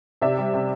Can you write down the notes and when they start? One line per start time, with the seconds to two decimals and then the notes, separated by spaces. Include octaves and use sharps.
0.22 C3 D5 E5
0.38 G3
0.54 C3